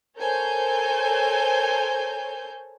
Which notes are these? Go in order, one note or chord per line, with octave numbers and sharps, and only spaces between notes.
A4 A#4 C5 C#5 G#5 G6